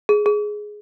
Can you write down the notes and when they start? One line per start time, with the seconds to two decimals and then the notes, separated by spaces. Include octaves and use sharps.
0.09 G#4
0.26 G#4